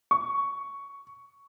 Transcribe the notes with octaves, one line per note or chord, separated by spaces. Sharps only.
C#6